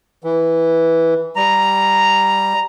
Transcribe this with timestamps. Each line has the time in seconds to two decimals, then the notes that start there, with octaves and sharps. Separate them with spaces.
0.24 E3
1.36 G3 A#5